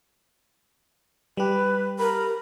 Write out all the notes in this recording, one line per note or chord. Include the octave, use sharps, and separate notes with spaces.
G3 G4 B4
A#4 B5